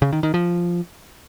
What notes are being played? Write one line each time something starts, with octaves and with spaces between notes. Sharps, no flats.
C#3
D#3
D#3
F3